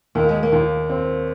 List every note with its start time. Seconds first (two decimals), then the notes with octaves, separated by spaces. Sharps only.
0.15 D#2 A#3
0.29 G#3
0.43 A#3
0.52 D#2
0.90 C4